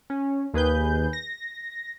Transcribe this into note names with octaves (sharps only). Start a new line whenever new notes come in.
C#4
D#2 G#4 B4 G6
A#6